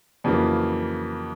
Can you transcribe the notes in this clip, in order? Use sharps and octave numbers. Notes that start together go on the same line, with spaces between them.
F2 C#3 E3 F#3 A#3